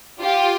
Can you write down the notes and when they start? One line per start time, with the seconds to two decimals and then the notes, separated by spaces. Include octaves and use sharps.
0.20 F4 G4